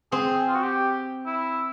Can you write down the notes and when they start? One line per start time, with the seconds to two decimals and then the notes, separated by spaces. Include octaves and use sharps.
0.12 C4 G#4
0.47 F4
0.55 F#4
0.63 G4
1.26 E4